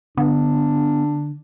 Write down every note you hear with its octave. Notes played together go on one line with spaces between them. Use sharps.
D3 B3 D4